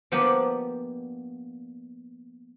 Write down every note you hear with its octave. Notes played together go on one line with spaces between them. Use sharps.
F3 A#3 B3 D4 G4 B4